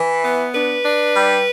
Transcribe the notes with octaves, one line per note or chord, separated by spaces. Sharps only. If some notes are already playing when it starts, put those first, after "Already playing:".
Already playing: E3
B3
D4 B4
D4
G3